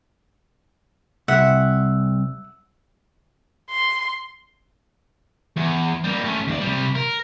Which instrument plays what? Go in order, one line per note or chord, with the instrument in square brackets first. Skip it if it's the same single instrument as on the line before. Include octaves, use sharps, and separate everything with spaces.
[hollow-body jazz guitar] C2 [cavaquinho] E5 F#5
[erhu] C6
[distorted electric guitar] E2
G3 A#3
A3 C#4
D#2 D5
C3 G3
A#4